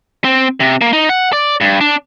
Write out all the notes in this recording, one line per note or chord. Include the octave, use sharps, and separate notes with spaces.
C4
C3
A#3
D#4
F#5
D5
G2
D4